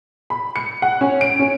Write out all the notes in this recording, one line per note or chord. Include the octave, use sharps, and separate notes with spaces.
B5
C#7
F#5
C#4
D7
C#4